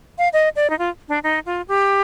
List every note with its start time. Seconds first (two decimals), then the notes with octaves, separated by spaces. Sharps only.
0.18 F5
0.33 D#5
0.56 D5
0.70 D#4
0.79 F4
1.09 D4
1.24 D#4
1.46 F4
1.68 G4